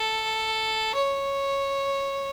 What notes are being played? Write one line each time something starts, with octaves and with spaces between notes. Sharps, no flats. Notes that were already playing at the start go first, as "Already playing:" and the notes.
Already playing: A4
C#5